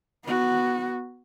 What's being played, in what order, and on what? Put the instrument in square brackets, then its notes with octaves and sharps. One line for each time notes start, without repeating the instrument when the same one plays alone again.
[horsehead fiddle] B3 F#4